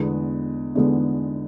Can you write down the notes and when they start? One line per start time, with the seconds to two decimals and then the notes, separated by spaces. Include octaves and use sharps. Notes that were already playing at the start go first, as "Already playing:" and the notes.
Already playing: E2 D3 G#3 B3
0.75 E2 D3 G#3 B3